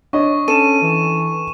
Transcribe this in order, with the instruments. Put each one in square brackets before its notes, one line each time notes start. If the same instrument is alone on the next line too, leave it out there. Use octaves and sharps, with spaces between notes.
[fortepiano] D4 C#5 D#5 [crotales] C#6
[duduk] C#4 [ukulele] A4 [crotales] D#7 E7
[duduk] E3